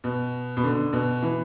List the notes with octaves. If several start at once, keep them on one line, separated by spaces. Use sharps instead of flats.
B2
B2
D3
B2
E3